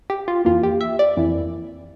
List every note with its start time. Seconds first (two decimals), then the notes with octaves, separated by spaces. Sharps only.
0.10 G4
0.28 F4
0.45 F2 E3 A#3 F4
0.63 G4
0.81 E5
0.99 D5
1.17 F2 E3 A#3 E4